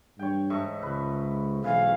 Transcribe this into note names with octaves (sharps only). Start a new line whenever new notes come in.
G2 C#5 G5
G#2 A3 C#6
C#2 B4
B1 E3 F5